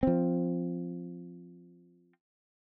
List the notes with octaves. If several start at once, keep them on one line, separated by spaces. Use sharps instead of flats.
F3 C4